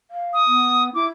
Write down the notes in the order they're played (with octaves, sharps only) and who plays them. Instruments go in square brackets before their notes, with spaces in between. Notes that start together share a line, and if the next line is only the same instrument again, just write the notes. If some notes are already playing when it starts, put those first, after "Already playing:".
[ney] F5
[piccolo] D#6
[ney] B3
[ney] E4 [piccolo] D6